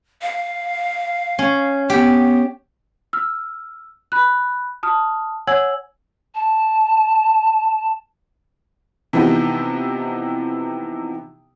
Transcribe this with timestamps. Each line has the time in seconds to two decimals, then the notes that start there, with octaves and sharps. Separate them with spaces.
0.22 F5
1.39 C#4
1.90 B3 G4
3.13 E6 F6
4.12 B5 F#6
4.83 A5 D#6 F6
5.47 C#5 F#5 G#5 E6 G#6 F#7
6.35 A5
9.13 C3 E3 F3 B3 D#4 G4